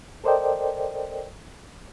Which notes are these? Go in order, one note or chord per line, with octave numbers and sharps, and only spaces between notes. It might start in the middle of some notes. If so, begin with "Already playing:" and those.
A4 A#4 C5 D5 D#5 G5